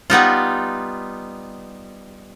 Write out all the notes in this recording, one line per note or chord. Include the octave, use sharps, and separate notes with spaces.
G3 B3 D#4 F4